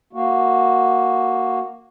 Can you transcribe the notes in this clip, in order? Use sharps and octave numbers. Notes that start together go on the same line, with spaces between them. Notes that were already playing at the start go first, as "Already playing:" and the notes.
A#3 F#4